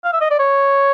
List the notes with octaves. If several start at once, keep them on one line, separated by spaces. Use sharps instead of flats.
F5
E5
D#5
D5
C#5